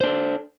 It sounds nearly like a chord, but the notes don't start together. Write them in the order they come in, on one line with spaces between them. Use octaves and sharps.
C5 D4 A4